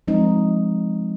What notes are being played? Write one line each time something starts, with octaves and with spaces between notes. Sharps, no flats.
F3 G#3 C4 D#4